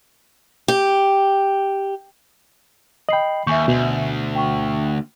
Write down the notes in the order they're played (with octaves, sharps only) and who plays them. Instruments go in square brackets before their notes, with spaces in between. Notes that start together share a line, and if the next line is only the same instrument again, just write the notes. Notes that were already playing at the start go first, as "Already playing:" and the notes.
[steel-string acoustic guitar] G4
[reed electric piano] D#5 G5 [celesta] B5 C7 F#7
[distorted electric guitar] D#2 [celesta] E5 G#5 G6 [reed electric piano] C#6
[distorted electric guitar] D2 [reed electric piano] B2
[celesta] G5 C#6